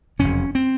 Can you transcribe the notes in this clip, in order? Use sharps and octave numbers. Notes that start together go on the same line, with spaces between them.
F#1 F2 C3 C#4
C4